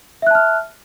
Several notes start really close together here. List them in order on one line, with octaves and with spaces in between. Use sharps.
E5 F#6 A5 F6